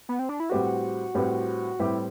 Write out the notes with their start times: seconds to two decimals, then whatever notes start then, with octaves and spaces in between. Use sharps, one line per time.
0.09 B3
0.19 C4
0.29 D4
0.40 E4
0.50 A2 G3 C4 F#4 G4 B4
1.14 A2 G3 C4 G4 B4
1.79 A2 G3 C4 E4 G4 B4